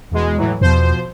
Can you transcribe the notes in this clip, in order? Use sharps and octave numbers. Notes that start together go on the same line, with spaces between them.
E2 B2 G#3
A2 E3 F#3
E2 B2 F3 C5